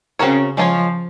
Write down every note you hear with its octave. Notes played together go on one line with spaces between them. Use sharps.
C#3 C4 F#4 A#4 C#5
F3 G#3 C#4 F4 A#4 C#5